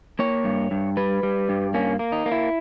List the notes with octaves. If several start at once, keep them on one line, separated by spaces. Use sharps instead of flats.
A#3 C#5
G2
G2
G3 B4
G3
G2
A#3 C#4
A#3
D#4
A#3
E4